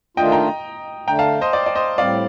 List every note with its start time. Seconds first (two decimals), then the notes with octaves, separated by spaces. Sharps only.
0.17 D#3 A3 D4 F4 D#5 G5
0.32 G5 A#5
1.08 D3 A3 D4 G5 A#5
1.19 F5 A5
1.41 C5 D#5
1.53 D5
1.66 D5
1.75 C5 D#5
1.98 A2 G3 C4 D5 F5